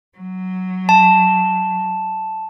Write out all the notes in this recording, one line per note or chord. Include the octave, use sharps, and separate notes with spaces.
F#3
A5